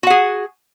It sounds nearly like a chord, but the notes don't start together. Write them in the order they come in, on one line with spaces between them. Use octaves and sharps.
F#4 F#5 G#4